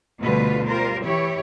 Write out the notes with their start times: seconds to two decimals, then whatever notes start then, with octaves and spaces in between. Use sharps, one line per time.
0.20 D2 B2 D3 G3 F4 B4
0.67 G3 F4 A#4 C5
1.03 E3 E4 G4 C#5